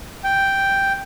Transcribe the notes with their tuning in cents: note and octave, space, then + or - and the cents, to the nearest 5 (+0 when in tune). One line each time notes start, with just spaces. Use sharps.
G5 +0